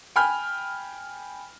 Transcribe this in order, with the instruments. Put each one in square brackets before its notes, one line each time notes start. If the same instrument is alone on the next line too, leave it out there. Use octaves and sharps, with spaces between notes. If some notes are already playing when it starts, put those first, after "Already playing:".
[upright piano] G5 G#5 B5 F6